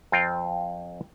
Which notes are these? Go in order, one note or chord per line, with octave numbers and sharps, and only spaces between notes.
F2 C4 F4 F5 G5